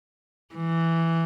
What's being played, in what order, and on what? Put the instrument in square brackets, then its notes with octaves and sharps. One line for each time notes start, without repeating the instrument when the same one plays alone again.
[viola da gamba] E3